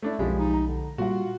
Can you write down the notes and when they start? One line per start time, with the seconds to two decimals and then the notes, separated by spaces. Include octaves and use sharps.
0.02 A3 D4 E4
0.19 B1 F2 F3 G#3 G4 B5
0.39 D#4
0.54 A#5
0.68 D3
0.98 A#2 G3 F4 F#4 F#5